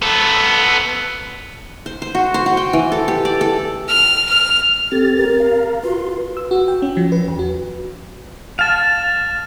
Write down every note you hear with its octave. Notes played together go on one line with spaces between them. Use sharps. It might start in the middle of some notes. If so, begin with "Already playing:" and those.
B3 A4
C5
C5
F#4
C5
F#4
G5
E3
A4
G4
D5
A4
F6
F6
C4 G4 A4 A6
A#4
F5 A#5
F4 F#4 B4 C6
E6
F#4
G5
C#4
F3
B4
E2
F#4
F5 A5 F6 A6